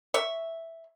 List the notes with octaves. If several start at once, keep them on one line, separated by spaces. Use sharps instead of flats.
C#5 E5